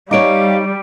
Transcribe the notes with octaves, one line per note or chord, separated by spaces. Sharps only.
G3 D#4 C#5 F5 D6 D7